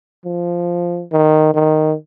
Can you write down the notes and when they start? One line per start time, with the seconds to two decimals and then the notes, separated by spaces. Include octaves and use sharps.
0.25 F3
1.12 D#3
1.55 D#3